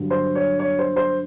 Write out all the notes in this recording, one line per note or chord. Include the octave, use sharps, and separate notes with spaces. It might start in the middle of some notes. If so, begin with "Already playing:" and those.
Already playing: G2 D3 F#3
C5
C#5
C#5
C5
C5